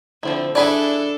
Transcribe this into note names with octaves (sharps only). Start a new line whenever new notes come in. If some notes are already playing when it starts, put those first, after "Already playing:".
D3 F3 C4 E4
D4 E4 G#4 A4 B4 D5 G#5 B5